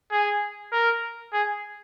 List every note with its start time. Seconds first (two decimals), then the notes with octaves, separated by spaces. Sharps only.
0.12 G#4
0.72 A#4
1.33 G#4